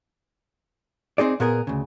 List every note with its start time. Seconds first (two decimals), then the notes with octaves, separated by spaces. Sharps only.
1.18 C4 D#4 G#4 D5
1.40 A#2 B3 G#4 A#4
1.67 D2 C#3